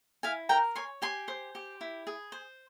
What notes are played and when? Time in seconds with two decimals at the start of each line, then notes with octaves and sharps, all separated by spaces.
0.23 E4 F5 G#5
0.49 A#4 G5 A#5
0.75 C#5 G#5 C6
1.02 G4 G#5 C6
1.28 C5
1.55 G4
1.81 E4
2.07 G#4
2.32 C5